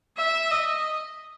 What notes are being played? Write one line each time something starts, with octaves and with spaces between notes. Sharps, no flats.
E5
D#5